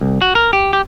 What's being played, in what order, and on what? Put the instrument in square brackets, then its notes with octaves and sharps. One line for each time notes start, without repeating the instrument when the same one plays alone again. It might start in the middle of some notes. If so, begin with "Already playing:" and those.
[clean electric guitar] C2
F#4
A#4
G4
G4